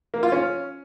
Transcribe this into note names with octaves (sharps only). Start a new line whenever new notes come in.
A#3
F4
C#4